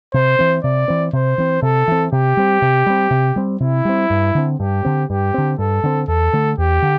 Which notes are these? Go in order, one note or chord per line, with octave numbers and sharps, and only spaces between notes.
C3 C5
E3 C4
C3 D5
E3 C4
C3 C5
E3 C4
C3 A4
E3 C4
C3 G4
G3 C4
C3
G3 C4
C3
G3 C4
C3 E4
G3 C4
G2
D3 C4
G2 G4
D3 C4
G2 G4
D3 C4
G2 A4
D3 C4
E2 A4
D3 A3
E2 G4
D3